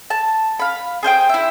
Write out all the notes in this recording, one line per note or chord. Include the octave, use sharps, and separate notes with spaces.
A5
F5 B5
G#4 C5 F5 G5
E4 E5